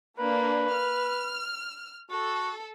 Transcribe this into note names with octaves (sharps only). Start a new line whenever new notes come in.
A#3 D4 B4
F6
F#4 A4